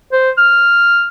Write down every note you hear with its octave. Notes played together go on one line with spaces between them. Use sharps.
C5
F6